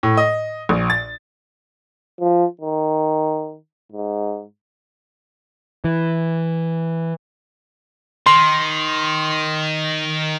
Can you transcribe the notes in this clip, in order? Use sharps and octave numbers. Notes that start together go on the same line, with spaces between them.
A2
D#5
A#1
A6
F3
D#3
G#2
E3
D#3 C6